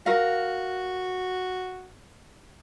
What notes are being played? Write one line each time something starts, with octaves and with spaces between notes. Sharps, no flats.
F#4 A#4 F5